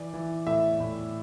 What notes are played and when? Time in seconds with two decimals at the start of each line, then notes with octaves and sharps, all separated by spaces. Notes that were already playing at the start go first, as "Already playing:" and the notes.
Already playing: E3 D5
0.14 E3
0.47 A2 E5
0.80 A2